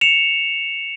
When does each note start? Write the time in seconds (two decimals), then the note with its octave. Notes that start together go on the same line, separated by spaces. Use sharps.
0.01 C#7 E7 F7